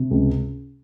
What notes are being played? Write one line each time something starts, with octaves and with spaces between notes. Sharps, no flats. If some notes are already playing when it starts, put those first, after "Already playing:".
Already playing: C3
C#2